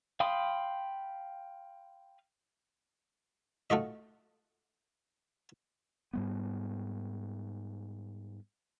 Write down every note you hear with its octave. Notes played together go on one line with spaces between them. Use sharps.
F5 G5 B5 C6 D#6
A3 F4 F#4 D#5
G#2 G3 B3